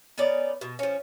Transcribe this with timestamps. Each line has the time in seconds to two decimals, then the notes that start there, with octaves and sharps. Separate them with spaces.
0.18 B3 C#4 D#4 D5
0.61 B2
0.79 F3 C#4